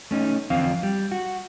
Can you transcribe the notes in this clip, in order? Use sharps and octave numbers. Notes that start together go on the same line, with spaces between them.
A3 C#4 D#4
E2 D3 F3 C4 F5
G3
F#4